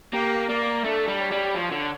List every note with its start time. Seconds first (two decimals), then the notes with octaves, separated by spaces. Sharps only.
0.13 A#3 G4
0.49 A#3 D5
0.84 A3 D4
1.08 G3
1.20 C#5
1.31 G3
1.55 F3 C#5
1.72 D3